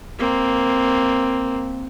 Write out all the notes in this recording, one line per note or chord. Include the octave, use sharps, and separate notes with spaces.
A#3 C4